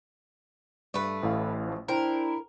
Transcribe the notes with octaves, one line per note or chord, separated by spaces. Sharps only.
G2 A3 B4
A1 A2 F5
F3 A3
D4 E4 A#4 C5 G5